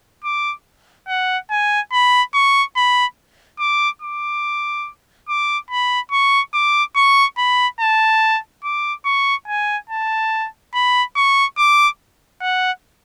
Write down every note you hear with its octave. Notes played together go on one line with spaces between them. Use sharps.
D6
F#5
G#5
B5
C#6
B5
D6
D6
D6
B5
C#6
D6
C#6
B5
A5
D6
C#6
G#5
A5
B5
C#6
D6
F#5